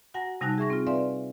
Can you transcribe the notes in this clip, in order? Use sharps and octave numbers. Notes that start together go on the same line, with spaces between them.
F#4 F#5 G#5 A#5 A#6
C3 G3 D#4 G#5 A5 F#6
G#4 E5 C#6 A#6
C4 F4
B4 D5 E5 F5 G#5 C6